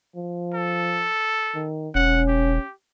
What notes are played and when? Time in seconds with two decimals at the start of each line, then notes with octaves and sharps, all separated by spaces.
0.16 F3
0.54 A4
1.55 D#3
1.95 E1 C#4 F#5
2.28 G4